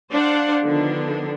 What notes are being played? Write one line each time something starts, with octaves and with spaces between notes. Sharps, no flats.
D4 C5 D5 F5 F#5
D3 D#3 F3 B3 D4